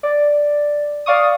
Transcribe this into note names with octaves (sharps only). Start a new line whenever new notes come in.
D5
D5 F5 C#6 D#6